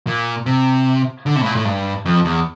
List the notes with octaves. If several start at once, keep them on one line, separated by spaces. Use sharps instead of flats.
A#2
C3
D3
C3
A2
A#2
A2
G2
F2
E2